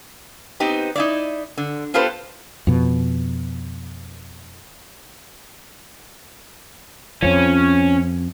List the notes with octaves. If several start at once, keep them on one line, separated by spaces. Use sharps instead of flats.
B3 C4 D#4 G4
D#4 E4 D5
D3
B3 F4 G4 A4 B4 C5
F2 B2
F2 F3 C#4